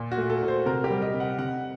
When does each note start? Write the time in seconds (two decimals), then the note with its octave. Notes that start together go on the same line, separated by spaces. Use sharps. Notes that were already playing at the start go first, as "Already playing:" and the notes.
Already playing: A#2
0.12 F#4
0.18 A3
0.30 A4
0.43 A#2
0.48 C5
0.66 C3 A#4
0.84 G4
0.90 G3
1.02 D#5
1.14 C3
1.20 F#5
1.39 C3 F#5